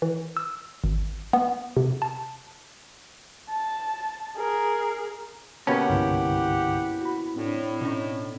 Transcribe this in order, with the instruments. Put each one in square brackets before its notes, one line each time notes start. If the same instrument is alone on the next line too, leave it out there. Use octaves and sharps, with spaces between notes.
[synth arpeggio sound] E3
E6
G#1
B3
C3
A5
[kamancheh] A5
G#4 A#4
[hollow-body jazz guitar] D2 B3 A5 [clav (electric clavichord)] B2 A#3 C#4 [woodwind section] G4 F#5
[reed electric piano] C2 G2 D3 [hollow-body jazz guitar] E4
[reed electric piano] F#4 B5
[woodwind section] A2 [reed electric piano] C4 D4
[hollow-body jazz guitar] B2 C#4 D#4